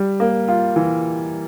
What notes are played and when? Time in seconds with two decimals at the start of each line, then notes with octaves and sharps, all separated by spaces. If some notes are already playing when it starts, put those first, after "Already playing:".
Already playing: G3
0.20 A#3
0.48 F4
0.76 E3